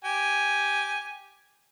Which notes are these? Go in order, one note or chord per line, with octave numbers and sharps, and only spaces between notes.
G4 G#5